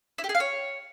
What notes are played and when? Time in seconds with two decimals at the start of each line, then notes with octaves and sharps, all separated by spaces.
0.18 E4
0.24 G4
0.29 G#4
0.35 F5
0.40 C#5